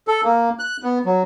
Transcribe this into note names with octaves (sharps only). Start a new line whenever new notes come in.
A4
A#3
F#6
B3
F#3